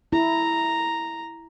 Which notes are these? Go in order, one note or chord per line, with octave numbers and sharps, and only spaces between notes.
E4 A#5